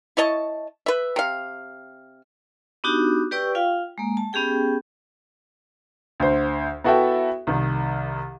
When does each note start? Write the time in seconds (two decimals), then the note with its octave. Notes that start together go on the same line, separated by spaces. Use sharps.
0.17 E4 C#5 D#5 A5
0.86 B4 E5
1.16 C3 F5
2.84 B3 D4 D#4 F#4 G4
3.31 G4 B4 D5 G5 C#6 E6
3.55 F4 F5 G5
3.98 G#3 A#3
4.17 A5
4.33 B3 C#4 G4 G#4 G5
6.20 D2 C5
6.84 B3 E4 F#4 A4 E5 G5
7.47 C2 D#3